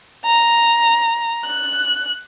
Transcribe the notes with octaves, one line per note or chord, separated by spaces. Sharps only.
A#5
F#6